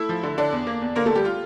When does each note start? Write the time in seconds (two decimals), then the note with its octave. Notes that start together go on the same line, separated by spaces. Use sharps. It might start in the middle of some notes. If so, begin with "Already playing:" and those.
Already playing: A3 E4 E5
0.09 F3
0.23 D3
0.38 D3 D4 D5
0.52 E2
0.67 A#3
0.81 E2
0.96 D3 A#3 A#4
1.06 D3 A3 A4
1.15 G3 G4
1.25 F4